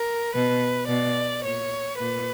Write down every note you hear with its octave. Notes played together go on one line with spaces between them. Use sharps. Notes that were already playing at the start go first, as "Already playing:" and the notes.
Already playing: A#4
B2 B4
B2 D5
A#2 C#5
A#2 B4